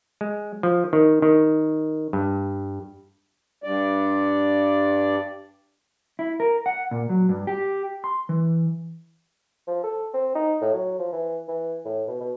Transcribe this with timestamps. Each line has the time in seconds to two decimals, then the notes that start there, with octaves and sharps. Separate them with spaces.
0.21 G#3
0.63 F3
0.93 D#3
1.22 D#3
2.13 G2
3.64 G2 D5
6.19 E4
6.40 A#4
6.66 F#5
6.91 A#2
7.09 F#3
7.29 G2
7.47 G4
8.04 C6
8.29 E3
9.68 F3
9.84 A4
10.14 C4
10.35 D#4
10.61 A2
10.73 F#3
10.99 F3
11.12 E3
11.48 E3
11.85 A2
12.08 B2
12.20 B2